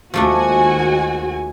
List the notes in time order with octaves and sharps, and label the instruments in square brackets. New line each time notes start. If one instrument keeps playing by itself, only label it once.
[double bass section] D#2 G#3 [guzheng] F3 A3 D4 [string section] F#4 G#5